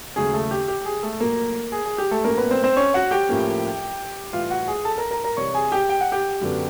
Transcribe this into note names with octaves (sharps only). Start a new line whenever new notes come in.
D#2 C#3 F#3 A3 C#4 G#4
A3 A4
G4
G4
G#4
A3 A4
A#2 F#3 A3 A#3 A#4
G#4
G#4
G4
A3 A4
A2 F#3 A#3 C#4 A#4
B3 B4
C4 C5
C4 C5
C#4 C#5
F#4 F#5
G4 G5
A2 F3 A#3 C#4
A2 E3 G3 F4 F5
F#4 F#5
G#4 G#5
A4 A5
A#4 A#5
A#4 A#5
A#4 A#5
C3 E3 G3 C#5 C#6
G#4 G#5
G4 G5
G5
F#5
G4 G5
F#2 D3 F#3 B3